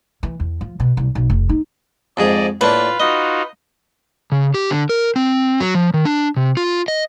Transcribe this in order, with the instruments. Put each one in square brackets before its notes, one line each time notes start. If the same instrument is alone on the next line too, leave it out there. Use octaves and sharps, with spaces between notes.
[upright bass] E3
E2
F3
B2
C2
B1
F1
D#4
[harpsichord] F2 G#2 G#4 [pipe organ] D5 D#5
[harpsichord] A2 A#3 D4 [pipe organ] F4 [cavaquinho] B4
[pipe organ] D#4 F4 F#4 [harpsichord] D#5
[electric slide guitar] C#3
G4
D3
A#4
C4
F#3
F3
D#3
D4
C3
F4
D#5